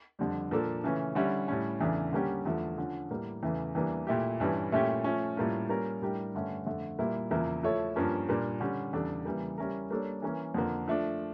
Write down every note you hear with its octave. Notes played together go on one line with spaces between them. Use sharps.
F2 D3 G3 D4
A#2 F3 A#3 D4 A4
C#3 E3 A3 C#4
D3 G3 C#4 E4
A2 G3 C#4
E2 C#3 E3 A3 D4
D3 G3 A#3 C#4 G4
E2 D3 F3 A3
D3 F3 C#4
A2 G3 A#3
E2 C#3 E3 A3
E2 E3 G3 A#3 D4
A#2 A3 E4 G4
G2 E3 G3 C#4 E4
A#2 A3 C#4 E4 G4
F3 A3 C#4
A2 G3 A#3 C#4 F4
G3 A#3 C#4 F4 A#4
A2 G3 D4 G4 A#4
G2 D3 A3 C#4
F2 D3 A3
A#2 G3 A#3 E4
E2 C#3 F3 A#3 E4
F3 A3 E4 A4 C#5
G2 F3 A#3 C#4
A#2 G3 A#3 D4
D3 G3 C#4
E2 C#3 G3 D4 A4
C#3 E3 G3 A#3
G3 C#4 E4 A#4
G3 A#3 D4 A4 C#5
E3 A#3 C#4
F2 D3 F3 A#3
F3 A3 D4